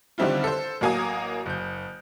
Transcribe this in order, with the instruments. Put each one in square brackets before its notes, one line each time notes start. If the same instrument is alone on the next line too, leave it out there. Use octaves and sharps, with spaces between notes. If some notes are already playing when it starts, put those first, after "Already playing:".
[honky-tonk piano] D3 D#3 G3 C4 E4 F4
A4 C5
A1 F#3 A#3 G#5 A#5 D#6
F#1 G6